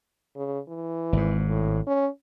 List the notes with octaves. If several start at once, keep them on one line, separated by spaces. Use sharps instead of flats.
C#3
E3
G#1 G#2
A2
C#4